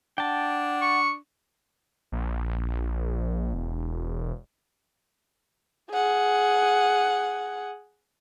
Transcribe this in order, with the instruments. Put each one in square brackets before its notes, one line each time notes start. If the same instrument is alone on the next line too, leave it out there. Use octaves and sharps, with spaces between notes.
[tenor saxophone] D4 [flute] F#5 [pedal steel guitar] G5 A5
[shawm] C#6
[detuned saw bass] A#1
E1
[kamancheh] G#4 F#5